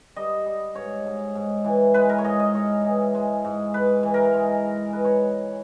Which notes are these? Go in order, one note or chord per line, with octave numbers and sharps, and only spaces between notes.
G3 D#5
G3
G#2 C#5
G#2
G#2
E3
G#3 B4
A#4
C#5
G#2 D#5
D#5
G#2 C#5
E3
G#3
G#2
G#2 B4
E3
A#4
G#3
G#2
G#3 B4
C#5